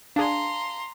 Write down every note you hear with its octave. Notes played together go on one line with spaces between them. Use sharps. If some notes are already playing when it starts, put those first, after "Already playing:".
D4 G#4 F5 A5 A#5 C6